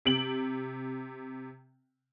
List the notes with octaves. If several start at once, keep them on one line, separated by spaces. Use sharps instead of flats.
C3 D7 F#7